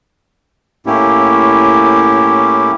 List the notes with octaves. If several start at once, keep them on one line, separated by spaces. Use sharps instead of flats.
A2 A#3 C#4 E4 G4